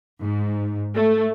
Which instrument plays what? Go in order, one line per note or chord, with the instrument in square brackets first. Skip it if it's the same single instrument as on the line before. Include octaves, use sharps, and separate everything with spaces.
[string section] G#2
A3